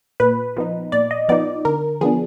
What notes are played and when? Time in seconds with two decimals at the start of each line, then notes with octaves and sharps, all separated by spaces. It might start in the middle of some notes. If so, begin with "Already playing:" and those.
0.20 A#2 B4
0.56 F3 B3 D#4
0.92 A#2 D5
1.11 D#5
1.29 F3 B3 D#4 D5
1.65 D3 A#4
2.01 F3 B3 D4 G#4